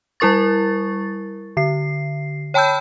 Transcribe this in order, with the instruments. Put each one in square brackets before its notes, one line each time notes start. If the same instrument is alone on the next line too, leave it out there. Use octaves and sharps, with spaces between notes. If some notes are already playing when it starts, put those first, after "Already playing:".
[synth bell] G3 E4 A#4 C#6 A6
D3 C7
C#5 G5 A5 B5 E6 G6